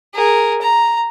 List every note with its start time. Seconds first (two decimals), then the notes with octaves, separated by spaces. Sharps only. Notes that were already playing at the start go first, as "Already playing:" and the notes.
0.14 G#4 A#4
0.61 A#5